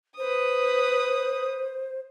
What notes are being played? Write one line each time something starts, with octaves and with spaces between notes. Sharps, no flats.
B4 C5 D#6